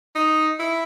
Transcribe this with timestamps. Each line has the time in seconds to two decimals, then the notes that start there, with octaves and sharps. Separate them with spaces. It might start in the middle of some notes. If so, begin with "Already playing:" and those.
0.15 D#4
0.59 E4